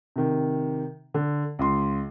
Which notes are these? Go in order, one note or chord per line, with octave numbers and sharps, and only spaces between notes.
C3 D#3
D3
C#2 C6